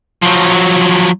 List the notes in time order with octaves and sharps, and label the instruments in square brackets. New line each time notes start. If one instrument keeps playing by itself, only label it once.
[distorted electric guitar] F3 F#3